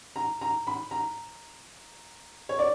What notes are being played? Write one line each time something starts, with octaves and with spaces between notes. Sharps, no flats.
A#5
A#5
B5
A#5
C#5
D5